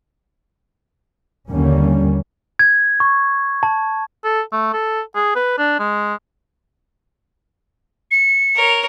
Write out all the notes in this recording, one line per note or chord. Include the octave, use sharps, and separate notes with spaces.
D#2 D3 G3 A#3 C#4
G#6
C#6
A5
A4
A3
A4
G#4
B4
D4
G#3
C#7
A#4 C#5